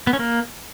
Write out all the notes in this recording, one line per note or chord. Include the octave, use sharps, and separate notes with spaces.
B3
C#4
A#3